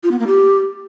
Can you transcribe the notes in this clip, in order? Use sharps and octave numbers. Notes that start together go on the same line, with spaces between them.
F4
B3
A#3
G4